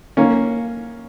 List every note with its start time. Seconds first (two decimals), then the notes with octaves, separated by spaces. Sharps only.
0.17 A#3 C#4